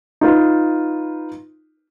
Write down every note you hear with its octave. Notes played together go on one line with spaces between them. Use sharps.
D#4 F4 B4